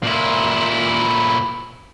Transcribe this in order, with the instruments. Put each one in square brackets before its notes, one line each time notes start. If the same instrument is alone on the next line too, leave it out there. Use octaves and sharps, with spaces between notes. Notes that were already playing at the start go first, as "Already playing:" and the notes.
[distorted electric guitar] A#2 E4